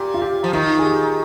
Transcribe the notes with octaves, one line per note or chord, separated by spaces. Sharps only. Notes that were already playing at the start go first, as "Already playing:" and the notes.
Already playing: A#2 G4
F4
G4
F3
D#3 F4
G#4
G4